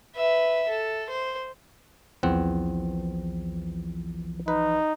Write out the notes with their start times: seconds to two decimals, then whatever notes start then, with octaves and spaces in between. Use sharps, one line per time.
0.16 B4 E5
0.69 A4
1.09 C5
2.23 B1 E2 E3 F3 C4 F#5
4.48 D#4 B4